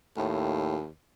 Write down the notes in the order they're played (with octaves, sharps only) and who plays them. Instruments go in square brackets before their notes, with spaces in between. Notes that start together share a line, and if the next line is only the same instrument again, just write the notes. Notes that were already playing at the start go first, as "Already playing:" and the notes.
[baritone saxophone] D#2 [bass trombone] A2